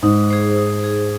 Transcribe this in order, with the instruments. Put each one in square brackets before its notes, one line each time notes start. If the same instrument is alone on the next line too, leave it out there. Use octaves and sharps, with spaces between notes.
[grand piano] G#2 [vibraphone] D#4
[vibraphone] G#4 C5
D#4
G#4 C5